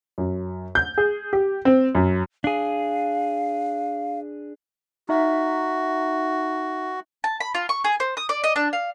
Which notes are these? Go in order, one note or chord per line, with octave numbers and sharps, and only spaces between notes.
F#2
G6
G#4
G4
C4
F#2
D4 G#4 F5
D#4 F#4 E5
A5
B5
F4
C#6
G#4
C5
D#6
D5
D#5
D4
F5